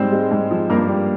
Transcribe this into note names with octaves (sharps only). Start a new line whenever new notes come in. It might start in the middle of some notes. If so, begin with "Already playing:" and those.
Already playing: G#2 G3 C4 C5
G#3
G#2
F3
G2 A#3 A#4
G3